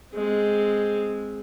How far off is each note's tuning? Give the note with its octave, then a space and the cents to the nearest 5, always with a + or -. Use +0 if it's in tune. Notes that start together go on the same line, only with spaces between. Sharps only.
G#3 +0 C4 +0